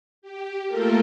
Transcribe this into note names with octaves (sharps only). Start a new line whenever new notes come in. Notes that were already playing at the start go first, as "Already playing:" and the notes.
G4
A3 A#3 F4 A4 A#4